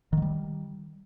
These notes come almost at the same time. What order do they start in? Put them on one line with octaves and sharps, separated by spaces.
D#3 F#3 G3